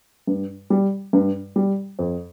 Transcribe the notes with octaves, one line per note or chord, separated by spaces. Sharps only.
G2
G3
G2
G3
F2